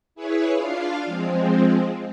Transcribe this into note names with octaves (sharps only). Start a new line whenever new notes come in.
E4 G#4 B4 C#5
D4 F4 F5
F3 G#3 C4